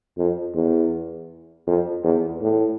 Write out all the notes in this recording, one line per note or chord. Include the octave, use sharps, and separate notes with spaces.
F2
E2
F2
E2
A2